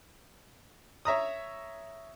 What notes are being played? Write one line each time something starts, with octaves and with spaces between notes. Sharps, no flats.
C#5 E5 A#5 D#6